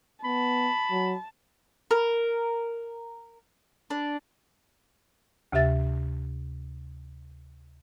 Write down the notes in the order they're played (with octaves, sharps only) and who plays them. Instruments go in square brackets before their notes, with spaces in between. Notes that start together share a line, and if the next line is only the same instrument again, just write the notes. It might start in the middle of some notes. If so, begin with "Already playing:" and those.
[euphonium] B3 [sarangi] A5 [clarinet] B5
[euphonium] F#3
[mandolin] A#4
D4
[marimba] D2 C3 G4 E5 A6